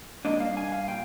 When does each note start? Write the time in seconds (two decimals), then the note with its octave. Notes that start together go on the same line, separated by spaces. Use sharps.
0.25 G2 D#3 A#3 D4 D#5
0.40 F5
0.57 G#5
0.72 F5
0.88 A#2 G5